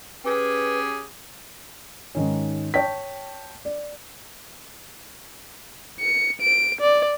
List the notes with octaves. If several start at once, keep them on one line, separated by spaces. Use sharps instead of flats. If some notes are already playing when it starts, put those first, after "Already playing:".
C#4 G4 G#4 B4
G#2 D#3 C#4
C#5 G5 A5 B6
D5
C#7
D7
D5